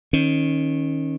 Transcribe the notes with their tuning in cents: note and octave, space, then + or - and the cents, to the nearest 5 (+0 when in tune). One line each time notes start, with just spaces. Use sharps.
D#3 +5 C#4 -20